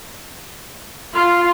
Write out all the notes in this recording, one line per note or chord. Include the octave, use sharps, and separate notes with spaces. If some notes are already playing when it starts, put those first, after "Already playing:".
F4